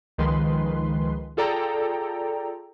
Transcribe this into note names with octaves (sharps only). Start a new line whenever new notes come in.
C#2 D#3 F3 G#3 B4 C6
F4 G#4 A4 D5 G5 A#5